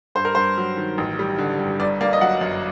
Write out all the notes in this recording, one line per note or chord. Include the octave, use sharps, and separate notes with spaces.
G2 C5
A#4
G2 C5
F#3
D#3
A1
G3
D3
G2
G1 D5
A#3 D5
D#5
F#3 F#5
F#2